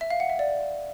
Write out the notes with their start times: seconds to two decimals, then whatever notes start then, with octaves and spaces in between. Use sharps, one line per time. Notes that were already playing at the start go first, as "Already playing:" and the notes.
0.01 E5
0.10 F5
0.20 F#5
0.30 E5
0.39 D5